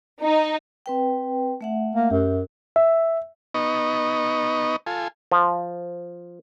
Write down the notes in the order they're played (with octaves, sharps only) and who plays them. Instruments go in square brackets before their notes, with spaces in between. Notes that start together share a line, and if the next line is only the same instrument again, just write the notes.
[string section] D#4
[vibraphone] C4 B4 G5
A3 E5 F#5
[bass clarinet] A#3
[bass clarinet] F#2 [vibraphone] G4
[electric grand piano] E5
[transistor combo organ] B3 D#4 D#5 C#6
F4 A4 G#5
[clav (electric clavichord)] F3